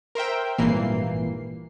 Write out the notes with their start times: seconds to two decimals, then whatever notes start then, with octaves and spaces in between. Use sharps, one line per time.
0.15 A#4 C5 E5 G5
0.58 G#1 G2 A#2 E3 A#3 C7